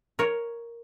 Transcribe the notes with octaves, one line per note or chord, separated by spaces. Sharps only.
A#4 C#5